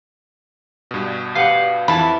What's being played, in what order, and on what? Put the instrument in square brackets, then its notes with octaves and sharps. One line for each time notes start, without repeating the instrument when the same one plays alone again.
[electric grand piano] G2 B2
[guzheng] G4 B4 C6 [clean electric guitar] F5 F#5
[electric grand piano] F2 [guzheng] E3 [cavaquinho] A5 B5